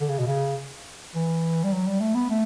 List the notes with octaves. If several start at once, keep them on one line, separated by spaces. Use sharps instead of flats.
D3
C#3
B2
C#3
E3
G3
F#3
G3
A3
B3
A3